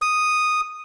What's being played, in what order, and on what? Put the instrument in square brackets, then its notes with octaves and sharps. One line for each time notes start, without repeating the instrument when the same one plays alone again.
[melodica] D#6